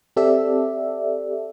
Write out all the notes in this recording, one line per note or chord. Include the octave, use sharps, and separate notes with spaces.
C4 G4 A4 D5 E5